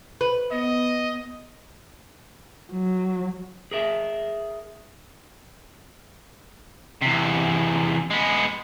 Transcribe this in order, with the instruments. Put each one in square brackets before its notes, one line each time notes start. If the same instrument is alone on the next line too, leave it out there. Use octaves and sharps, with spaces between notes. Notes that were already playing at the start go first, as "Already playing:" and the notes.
[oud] B4
[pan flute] B3 [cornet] D#5
[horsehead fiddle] F#3
[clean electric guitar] G#4 A#4 E5
[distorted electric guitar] E2 C3
G#3 B3